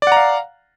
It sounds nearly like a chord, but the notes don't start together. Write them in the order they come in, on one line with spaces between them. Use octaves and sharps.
D5 F#5 A#5 F5